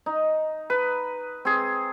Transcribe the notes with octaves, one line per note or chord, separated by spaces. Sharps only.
D#4
B4
C4 G#4